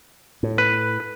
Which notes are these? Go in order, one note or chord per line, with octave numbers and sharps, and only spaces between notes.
A2
B4